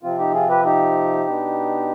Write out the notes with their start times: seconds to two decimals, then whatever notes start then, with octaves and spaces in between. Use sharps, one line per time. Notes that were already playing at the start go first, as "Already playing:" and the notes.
0.03 C3 F3 C4 F4
0.18 D#4 G4
0.34 F4 G#4
0.50 G4 B4
0.65 D#4 G4
1.27 B2 B3 D4